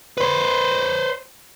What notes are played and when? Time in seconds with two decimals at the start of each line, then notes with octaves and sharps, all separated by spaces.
0.18 B4 C5